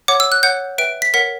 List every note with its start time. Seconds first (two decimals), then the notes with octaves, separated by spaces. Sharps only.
0.08 C#5 F#5 D6
0.20 E6
0.32 F#6
0.43 C#5 F#5 G6
0.78 B4 E5 G5 D7
1.02 B6
1.13 A#4 C#5 F#5 B6